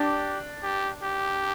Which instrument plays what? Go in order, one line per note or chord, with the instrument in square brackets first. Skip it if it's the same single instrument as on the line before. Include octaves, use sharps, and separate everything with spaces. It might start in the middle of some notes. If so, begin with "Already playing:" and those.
Already playing: [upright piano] D4 [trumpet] G4
[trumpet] G4
G4